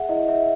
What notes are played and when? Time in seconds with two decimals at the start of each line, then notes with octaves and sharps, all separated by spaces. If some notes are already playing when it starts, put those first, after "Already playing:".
Already playing: G#4 E5 F#5
0.09 E4 D#5
0.29 E5